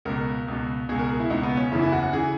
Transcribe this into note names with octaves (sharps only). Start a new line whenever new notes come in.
C#2 B2 A#4
C#2 B2
C#2 B2 G#4
A#4
G#4
E4
C#2 B2 D#4
B3
C#4
F#1 E2 C#3 E3 E4
E4
F#4
F#4
C#3 E3 G#4